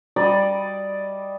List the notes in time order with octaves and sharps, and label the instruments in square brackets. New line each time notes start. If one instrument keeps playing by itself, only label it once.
[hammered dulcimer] G3 D5 D#5 A#5